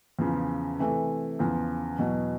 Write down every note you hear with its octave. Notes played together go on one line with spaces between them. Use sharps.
E2 C#3 F3
C3 E3 A3
E2 C#3 F3
E2 B2 F#3